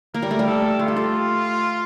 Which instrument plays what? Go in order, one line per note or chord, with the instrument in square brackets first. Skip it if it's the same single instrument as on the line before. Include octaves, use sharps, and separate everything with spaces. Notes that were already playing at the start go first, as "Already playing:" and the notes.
[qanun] A#3 [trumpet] A#4
[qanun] G3
A3
G3
[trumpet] A4
[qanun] A3 [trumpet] F4
[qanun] G4
A4